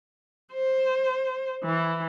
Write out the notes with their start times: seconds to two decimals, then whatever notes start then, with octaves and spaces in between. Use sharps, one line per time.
0.52 C5
1.64 E3